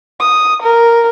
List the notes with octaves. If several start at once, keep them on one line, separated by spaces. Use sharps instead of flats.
D#6
A#4